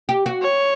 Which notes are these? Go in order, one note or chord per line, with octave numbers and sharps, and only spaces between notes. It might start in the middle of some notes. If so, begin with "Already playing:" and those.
G4
F#4
C#5